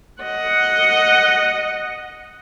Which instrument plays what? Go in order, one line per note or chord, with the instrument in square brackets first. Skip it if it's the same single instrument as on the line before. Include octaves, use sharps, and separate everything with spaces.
[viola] D#5 F#5